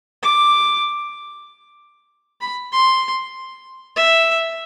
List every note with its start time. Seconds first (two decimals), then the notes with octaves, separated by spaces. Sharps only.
0.23 D6
2.41 B5
2.73 C6
3.96 E5